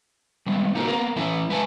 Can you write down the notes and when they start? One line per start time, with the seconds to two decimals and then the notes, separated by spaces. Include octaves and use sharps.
0.46 G3 G#3 B3
0.75 A#3 D#4 F4 F#4 A4 A#4
0.88 A#3 B3 A#4
1.16 E3 C#4 E4 A4 E5
1.49 G#3 B4 E5 G#5 A5